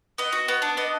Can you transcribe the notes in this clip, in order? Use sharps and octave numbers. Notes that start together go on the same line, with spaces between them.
B3 D#5
F#4
B3
D4
B3 D#5